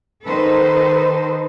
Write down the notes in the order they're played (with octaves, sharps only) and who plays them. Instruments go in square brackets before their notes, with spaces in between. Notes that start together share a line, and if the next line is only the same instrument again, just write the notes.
[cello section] D#3 D#4 A4 B4 C5